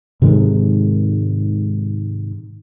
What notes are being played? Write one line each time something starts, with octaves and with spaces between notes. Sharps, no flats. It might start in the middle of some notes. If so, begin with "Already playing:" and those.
G#2 C3 D#3 G#3